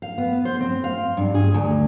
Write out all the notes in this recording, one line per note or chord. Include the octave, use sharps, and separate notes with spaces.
F5
B3
C5
C4
F5
G2
G#4
D2